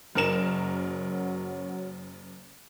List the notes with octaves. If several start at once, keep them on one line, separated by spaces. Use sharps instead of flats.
F#1 F#2 F#3 A#4 E7